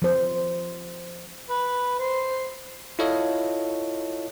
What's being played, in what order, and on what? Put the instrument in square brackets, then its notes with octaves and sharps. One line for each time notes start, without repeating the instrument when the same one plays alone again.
[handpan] F3 C5
[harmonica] B4
C5
[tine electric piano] E4 F4 A4 C#5 D#5 F5